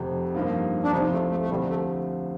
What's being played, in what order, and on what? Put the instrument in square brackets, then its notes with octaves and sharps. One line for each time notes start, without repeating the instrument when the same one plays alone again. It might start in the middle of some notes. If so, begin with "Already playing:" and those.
Already playing: [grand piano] F1 F2 C3
G2 F3 A#3 D#4
[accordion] D4
[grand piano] C2 C3 F3 [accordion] D#4
[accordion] A3
A3
A3
[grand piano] D2 C3 F3 [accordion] G3
[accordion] A3